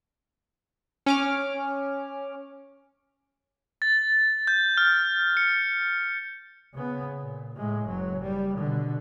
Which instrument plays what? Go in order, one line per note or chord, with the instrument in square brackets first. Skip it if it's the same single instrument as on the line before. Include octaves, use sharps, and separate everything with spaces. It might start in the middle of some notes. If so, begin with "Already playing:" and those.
[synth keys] C#4 D6 F6
[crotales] A6
G6
F6
C#7
[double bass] C#3 B3
A#2
A2 G#3
F#1 F#3
G3
B2 D3